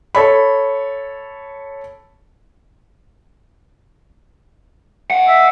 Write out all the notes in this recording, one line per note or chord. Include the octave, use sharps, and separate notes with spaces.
A4 C#5 B5
D#5 F#5
E5